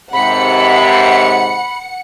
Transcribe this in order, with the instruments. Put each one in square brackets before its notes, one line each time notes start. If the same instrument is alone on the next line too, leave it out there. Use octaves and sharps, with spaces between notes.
[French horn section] D#2 G#2 C3 [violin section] F#5 C#7 [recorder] B5